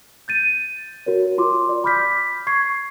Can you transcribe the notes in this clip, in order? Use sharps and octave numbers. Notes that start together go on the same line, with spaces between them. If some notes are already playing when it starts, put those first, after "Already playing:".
G6 A6 D#7
F#4 A#4 C#5
F4 C6 D6
D5
B5 D6 F6 G6 B6
C#6 G#6 C7